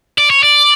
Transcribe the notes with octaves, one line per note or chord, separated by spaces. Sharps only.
D5
C#5
D5